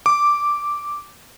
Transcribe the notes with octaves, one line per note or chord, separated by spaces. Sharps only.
D6